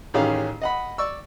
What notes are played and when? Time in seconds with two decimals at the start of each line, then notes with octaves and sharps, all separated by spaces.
0.14 A1 D#3 C#4 G4 G#4 F5
0.62 D#5 F#5 B5
0.98 D5 C#6 E6